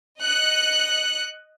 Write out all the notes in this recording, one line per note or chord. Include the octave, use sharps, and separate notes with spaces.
D#5 F#6 C#7